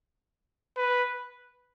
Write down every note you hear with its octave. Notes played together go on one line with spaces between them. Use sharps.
B4